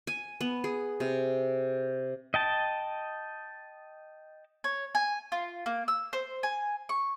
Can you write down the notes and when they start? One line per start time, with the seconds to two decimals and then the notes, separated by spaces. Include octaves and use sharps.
0.07 G#5
0.41 B3
0.64 G#4
1.00 C3
2.34 D#5 G5 A5
4.64 C#5
4.95 G#5
5.32 F4
5.66 A#3
5.88 E6
6.13 C5
6.43 G#5
6.89 C#6